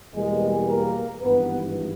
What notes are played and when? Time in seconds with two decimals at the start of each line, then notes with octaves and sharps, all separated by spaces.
0.15 E2 B2 G3 G#3 A#3 G#4
0.69 A#3 A#4
1.23 G#1 G2 E3 B3 B4